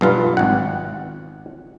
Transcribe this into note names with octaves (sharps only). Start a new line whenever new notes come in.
B1 G2 F4 B4
G#1 F#5